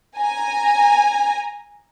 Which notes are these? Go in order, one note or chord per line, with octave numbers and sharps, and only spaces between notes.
G#5 A#5